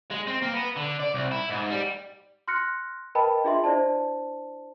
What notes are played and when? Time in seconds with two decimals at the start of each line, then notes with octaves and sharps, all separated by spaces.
0.11 G#3
0.27 C4
0.42 A#3
0.54 B3
0.76 D3
1.00 D5
1.14 C2
1.31 E4
1.50 G#2
1.70 G3
2.48 C6 F6 F#6 A#6 C#7
3.15 A#4 B4 D#5 G5 A5 B5
3.44 D4 F4 G#4 D#5 E5 C6
3.64 D4 E4 C5 D5 A5